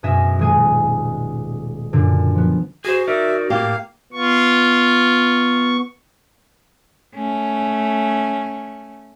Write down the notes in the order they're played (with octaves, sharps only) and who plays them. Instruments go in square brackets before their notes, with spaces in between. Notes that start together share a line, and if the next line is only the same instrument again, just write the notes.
[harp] F#2 B2 C#4 G#4 D#5 E5
D#1 G#3 G#4 D#7
F#2 A#2 D3 D4
F3 B3
[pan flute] F#4 [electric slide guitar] G#4 C5
[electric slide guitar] D#4 A#4 D5 [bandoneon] E5
[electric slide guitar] A2 [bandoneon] A#3 F5 [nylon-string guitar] G4
[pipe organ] B3 C#6 [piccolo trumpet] F4
[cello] A3 C#4